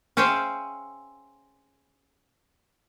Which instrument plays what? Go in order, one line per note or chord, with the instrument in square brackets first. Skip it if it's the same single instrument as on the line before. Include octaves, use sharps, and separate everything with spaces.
[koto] C#4 G#4 C5 E5 F5 G5